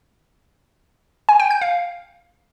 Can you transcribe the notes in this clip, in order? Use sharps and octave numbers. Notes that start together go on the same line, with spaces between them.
G#5
G5
G6
F5